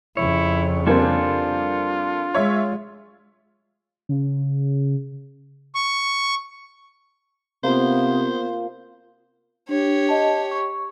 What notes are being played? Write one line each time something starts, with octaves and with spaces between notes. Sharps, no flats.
F2 C#3 E4 C#5
G3 A#3 C4 D4 F4 A4 G#5
G#3 C#5 E5
C#3
C#6
C3 A#3 B3 F4 C5
D4 G4 C#5
D#5 A5
C#6